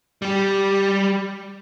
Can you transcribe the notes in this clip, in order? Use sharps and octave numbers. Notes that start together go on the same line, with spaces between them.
G3 G4